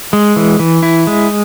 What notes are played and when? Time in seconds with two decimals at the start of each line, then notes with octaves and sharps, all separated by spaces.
0.13 G#3
0.36 E3
0.59 E3
0.83 E4
1.07 G#3